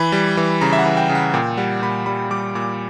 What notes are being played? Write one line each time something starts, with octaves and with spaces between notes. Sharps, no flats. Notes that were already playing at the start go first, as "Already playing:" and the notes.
Already playing: E3 B5
G3
E3
C#3 A#5
E5
F#5
E3
G5
C#3
F#5
A#2 G5
G3 F#5
A#2 B5
G3 B5
G3 D6
A#2 D6